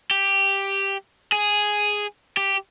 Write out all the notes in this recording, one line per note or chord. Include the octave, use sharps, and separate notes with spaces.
G4
G#4
G4